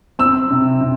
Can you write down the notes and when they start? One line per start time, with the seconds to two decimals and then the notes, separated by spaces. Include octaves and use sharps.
0.19 C4 E6
0.50 C3
0.81 C3